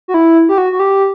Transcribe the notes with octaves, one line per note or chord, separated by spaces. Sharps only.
F#4
E4
G4
F#4
F#4
G4